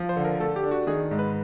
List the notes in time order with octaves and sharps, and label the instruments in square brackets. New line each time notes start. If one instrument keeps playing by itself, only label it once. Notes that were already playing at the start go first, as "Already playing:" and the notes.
Already playing: [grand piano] F3
[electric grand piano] C5
[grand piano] D3
[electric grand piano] A#4
[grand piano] A3 [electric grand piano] A4
[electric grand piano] G4
[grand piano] D4
[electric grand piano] F#4
[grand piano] D#3 [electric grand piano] G#4
[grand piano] G#2
[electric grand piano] B4